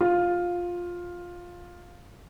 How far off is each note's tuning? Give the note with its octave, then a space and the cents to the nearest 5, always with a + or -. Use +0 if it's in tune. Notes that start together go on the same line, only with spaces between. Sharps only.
F4 +10